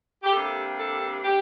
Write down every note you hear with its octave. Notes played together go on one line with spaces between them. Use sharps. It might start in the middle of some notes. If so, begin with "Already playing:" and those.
G4
C3 G3 A#3 D4 A4
A4
D3 G4